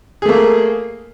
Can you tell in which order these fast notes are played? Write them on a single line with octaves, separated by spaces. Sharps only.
G#4 A3 A#3